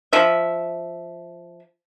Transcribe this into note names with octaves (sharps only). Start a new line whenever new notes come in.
F3 E5